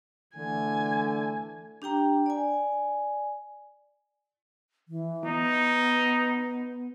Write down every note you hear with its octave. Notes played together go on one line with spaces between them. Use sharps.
D3 E3 A3 G#5
D4 G4 G5 A#5
D5 G#5
E3
B3 D#4